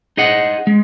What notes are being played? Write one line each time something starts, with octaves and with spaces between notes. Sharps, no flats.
D#4 G#4 D#5 F#5
G#3